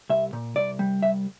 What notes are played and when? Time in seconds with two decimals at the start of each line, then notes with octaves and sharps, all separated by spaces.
0.10 C2 E5
0.33 A#2
0.56 C2 D5
0.79 G3
1.03 C2 E5